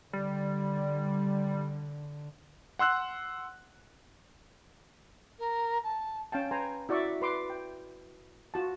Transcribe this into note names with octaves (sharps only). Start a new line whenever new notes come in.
D3 G3
F#5 C6 E6 F#6
A#4
A5
C#4 F5 G5 A5
B4 G5 G#5 A#5 C6
E4 F#4 D5 E5 C#6
F#4 B4 C6 D6
G5
F4 F#4 A5